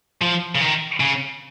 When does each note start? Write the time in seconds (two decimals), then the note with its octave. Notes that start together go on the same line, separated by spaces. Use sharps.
0.21 F3
0.55 C#3
0.61 D#3
1.00 C#3